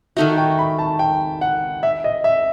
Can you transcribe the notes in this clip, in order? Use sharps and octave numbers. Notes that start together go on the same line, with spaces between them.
D#3 A3 D#4 F#4 E5
G5
B5
A5
G5
F#5
E5
D#5
E5